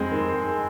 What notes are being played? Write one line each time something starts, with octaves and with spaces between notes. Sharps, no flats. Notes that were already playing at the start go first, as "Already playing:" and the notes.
Already playing: F2 G#3 C4
D#3